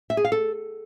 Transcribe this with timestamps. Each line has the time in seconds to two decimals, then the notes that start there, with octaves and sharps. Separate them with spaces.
0.10 E5
0.17 G#4
0.25 F5
0.32 A4